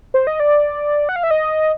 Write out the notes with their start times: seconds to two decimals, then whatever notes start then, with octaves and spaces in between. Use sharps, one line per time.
0.14 C5
0.27 D#5
0.40 D5
1.09 F#5
1.16 F5
1.23 E5
1.31 D#5